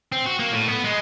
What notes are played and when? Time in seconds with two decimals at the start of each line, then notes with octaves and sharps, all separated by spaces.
0.12 C4
0.26 F#4
0.39 A#3
0.52 A2
0.68 B3
0.84 G#3